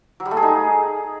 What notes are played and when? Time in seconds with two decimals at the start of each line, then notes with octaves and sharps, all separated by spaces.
0.20 F#3
0.25 G3
0.31 A3
0.37 G#4
0.42 D#4